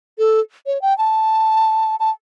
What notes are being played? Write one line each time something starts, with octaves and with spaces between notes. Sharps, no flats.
A4
C#5
G5
A5
A5